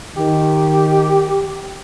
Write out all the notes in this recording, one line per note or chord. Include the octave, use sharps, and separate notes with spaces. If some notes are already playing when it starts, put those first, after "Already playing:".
D#3 G4